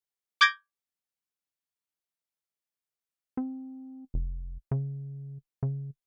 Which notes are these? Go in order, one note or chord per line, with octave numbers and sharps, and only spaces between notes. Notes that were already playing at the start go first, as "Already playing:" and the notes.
D6 G6 G#6 A#6 D7
C4
F1
C#3
C#3